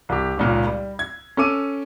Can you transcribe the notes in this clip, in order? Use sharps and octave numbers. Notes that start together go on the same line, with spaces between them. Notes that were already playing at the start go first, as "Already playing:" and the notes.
C2 G4
G#1 C#2 A#2
G3
G#6
C#4 A4 D6 D#7